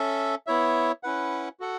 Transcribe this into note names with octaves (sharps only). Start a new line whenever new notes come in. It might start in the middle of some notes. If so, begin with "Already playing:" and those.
Already playing: C#4 A4 E5
B3 E4 C#5 E5
C#4 E4 B4 F#5
F#4 A4 F#5